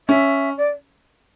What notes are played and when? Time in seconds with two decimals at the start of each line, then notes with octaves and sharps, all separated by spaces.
0.09 C#4 E5
0.57 D5